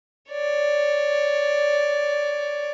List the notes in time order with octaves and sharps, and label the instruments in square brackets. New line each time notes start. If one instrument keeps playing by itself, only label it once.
[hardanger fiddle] C#5 D5